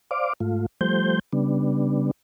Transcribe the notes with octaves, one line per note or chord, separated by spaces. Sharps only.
C5 D5 F5 D6
G#2 A3 F4
F3 G3 A3 C5 G6
C#3 G3 B3 D4